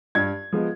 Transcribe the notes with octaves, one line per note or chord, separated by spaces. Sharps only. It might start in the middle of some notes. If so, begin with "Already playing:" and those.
G2 G#6
F3 G#3 B3